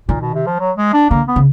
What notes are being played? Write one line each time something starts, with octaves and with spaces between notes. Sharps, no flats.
A#2 D#3
B2
C3
F3
F#3
G#3
D4
D3 A#3
B3
C#3